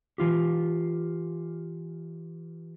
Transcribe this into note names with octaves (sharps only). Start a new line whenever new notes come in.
E3 F4 G4